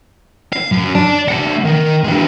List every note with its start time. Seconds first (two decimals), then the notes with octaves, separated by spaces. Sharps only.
0.53 F5
0.72 F#2 F#3
0.95 D5 A5
1.28 A3 F#5
1.65 D#3
2.04 G#3 D4